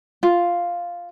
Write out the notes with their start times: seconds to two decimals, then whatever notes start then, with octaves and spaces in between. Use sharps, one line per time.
0.23 F4